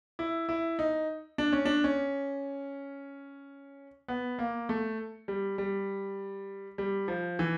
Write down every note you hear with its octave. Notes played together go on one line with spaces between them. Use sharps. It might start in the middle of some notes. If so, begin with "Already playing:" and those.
E4
E4
D#4
D4
C#4
D4
C#4
B3
A#3
A3
G3
G3
G3
F3
E3